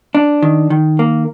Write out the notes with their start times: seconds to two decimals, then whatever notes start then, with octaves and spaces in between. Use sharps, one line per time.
0.15 D4
0.42 D#3
0.70 D#3
0.99 A#3